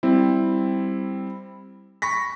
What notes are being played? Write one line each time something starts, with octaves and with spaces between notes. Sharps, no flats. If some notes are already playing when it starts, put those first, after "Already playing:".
G3 C4 E4
B5 C#6 A#6 B6